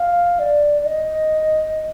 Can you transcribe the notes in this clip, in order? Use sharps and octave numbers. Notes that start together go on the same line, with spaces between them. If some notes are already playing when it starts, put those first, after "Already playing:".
Already playing: F5
D5
D5
D#5